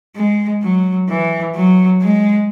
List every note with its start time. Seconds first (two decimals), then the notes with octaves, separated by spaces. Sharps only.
0.16 G#3
0.62 F#3
1.09 E3
1.55 F#3
2.02 G#3